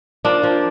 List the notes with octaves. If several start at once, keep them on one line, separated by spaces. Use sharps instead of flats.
F3 A#3 D4
F3